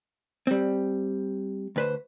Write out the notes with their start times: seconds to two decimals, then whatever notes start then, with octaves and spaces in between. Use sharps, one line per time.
0.47 G3 C4
1.76 D2 B4 C5